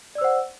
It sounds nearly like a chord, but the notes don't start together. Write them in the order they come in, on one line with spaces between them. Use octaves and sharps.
D5 E6 C5 F#5